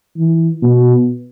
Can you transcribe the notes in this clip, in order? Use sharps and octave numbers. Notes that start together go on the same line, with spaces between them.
E3
B2